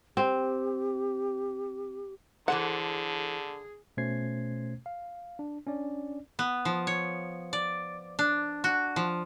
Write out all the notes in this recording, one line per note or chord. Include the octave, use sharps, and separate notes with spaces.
C4 G4
D3 E3 G#4 A4 C5 F#5
B2 A3 C#4 C5 G#6 C7
F5
D4
C#4 D4 D5
B3
F3
C#5
D5
D4
F#4
F3